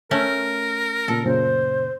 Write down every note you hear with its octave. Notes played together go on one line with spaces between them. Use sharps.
A3 C#4 A#4
A#2 C#3 A4
F#2 A#2 C#3 C5